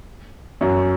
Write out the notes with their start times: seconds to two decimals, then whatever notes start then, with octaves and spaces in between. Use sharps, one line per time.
0.61 F#2